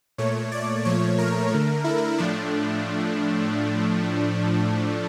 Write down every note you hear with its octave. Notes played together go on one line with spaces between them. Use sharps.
A#2 A3 C#5
D5
A#2 F3 A3 C#5
A#4
D3 A3
E4
A2 F3 A3 D4